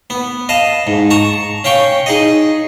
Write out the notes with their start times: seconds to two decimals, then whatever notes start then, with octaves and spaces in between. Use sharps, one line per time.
0.10 B3
0.49 D#5 F5 A5
0.87 G#2
1.10 A5 A#5 C#6
1.64 C#4 F5 G5 C#6
2.06 D#4 G#4 D#5